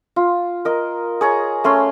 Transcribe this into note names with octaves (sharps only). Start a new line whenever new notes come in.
F4
A#4 D#5
G#4 C#5 A#5
A3 C#4 C6